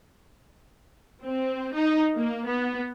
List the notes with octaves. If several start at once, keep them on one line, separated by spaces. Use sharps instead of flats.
C4
D#4
A#3
B3